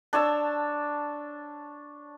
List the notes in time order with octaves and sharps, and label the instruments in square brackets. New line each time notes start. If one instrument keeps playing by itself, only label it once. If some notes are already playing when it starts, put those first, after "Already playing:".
[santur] D4 C#5 A5 E6